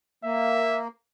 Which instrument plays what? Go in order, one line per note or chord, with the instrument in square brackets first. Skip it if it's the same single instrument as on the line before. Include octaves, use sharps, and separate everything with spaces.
[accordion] A#3 [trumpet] E5